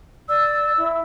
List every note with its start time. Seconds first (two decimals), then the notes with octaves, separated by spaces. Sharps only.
0.29 D5 E6
0.77 E4